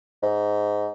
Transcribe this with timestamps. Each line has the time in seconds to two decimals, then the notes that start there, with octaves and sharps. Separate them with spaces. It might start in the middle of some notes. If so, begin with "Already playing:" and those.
0.23 G#2